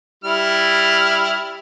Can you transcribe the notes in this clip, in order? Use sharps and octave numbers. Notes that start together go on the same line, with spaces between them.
G3 E4 F6